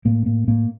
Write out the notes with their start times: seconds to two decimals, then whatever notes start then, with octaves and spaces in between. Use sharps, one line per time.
0.05 A2 A#3
0.26 A2 A#3
0.47 A2 A#3